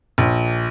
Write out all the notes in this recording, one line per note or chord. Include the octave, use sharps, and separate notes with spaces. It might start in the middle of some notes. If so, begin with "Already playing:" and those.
A#1